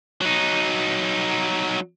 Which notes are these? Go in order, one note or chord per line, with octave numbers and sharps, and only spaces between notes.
F#3 D#4